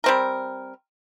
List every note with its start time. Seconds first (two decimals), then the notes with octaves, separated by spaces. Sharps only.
0.04 G3 C4 A#4